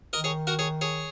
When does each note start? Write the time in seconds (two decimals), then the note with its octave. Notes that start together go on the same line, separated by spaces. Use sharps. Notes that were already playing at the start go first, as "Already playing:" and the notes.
0.13 D#3 A#4 D#5
0.24 G#4 C#5
0.47 F#4 A#4
0.59 G#4 C#5
0.81 G#4 C#5